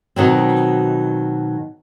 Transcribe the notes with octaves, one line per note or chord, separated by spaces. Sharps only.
B2 D#3 F#3 C4